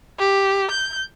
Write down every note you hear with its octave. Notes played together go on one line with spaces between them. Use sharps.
G4
G6